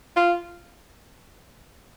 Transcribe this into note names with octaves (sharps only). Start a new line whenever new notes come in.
F4